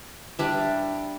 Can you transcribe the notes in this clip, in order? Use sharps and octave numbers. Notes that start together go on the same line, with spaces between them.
G3 D4 E5